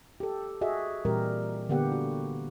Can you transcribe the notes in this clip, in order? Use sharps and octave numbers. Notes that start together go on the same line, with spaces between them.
G4 A4
F#4 G#4 D#5 E5
A#2 E3 G3 C4 G4 A#4
D3 A#3 B3 G4 F#5
F#4